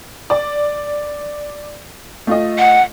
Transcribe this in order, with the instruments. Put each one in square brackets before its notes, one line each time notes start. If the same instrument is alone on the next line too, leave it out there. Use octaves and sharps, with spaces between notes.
[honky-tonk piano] D5
A3 F4 D#5
[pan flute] F#5